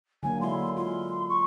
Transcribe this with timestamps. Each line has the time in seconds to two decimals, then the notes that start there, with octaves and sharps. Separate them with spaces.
0.23 D3 F#3 A#3 G#5
0.41 G#3 E4 C6
0.77 F4 C6
1.29 C#6